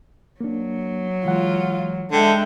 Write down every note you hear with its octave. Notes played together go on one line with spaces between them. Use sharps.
F#3 A#3 D4
E3 G#3 F4 F#5
D3 G#3 D4 E5 G5